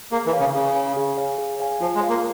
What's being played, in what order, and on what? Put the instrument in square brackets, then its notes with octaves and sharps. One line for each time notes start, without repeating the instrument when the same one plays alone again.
[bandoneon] A#3 [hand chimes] G#4
[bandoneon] E3
[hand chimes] C#5 F5 G#5
[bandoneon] C#3
[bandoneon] C#3 [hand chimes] G#4
[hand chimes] C#5 F5 G#5
G#4
C#5 F5 G#5
G#4
C#5 F5 G#5
[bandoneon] F3 [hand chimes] F4
[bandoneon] G#3
[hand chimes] G#4 C#5 F5
[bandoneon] A#3